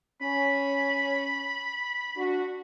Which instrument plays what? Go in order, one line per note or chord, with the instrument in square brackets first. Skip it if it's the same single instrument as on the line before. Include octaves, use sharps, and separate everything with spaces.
[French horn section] C#4 [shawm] B5
[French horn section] D4 F#4